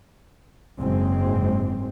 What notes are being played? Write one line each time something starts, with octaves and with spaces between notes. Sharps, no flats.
F#1 G#2 G#3 C4